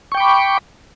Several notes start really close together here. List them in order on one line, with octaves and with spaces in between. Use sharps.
C#6 G5 D6 B5